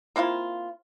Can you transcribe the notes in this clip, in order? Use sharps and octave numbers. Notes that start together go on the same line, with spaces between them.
A#3 C4 E4 F4